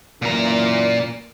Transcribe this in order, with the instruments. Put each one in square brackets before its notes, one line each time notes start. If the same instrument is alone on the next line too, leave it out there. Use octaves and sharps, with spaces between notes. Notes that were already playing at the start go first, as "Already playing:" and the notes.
[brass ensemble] F#2 E3 A#3 [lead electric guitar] A#2 A#5